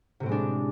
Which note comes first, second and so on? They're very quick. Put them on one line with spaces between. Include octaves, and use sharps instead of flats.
C3 A2 C4 G#3 D4